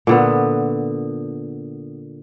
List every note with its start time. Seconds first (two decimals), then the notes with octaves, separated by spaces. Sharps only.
0.07 A#2 D3 B3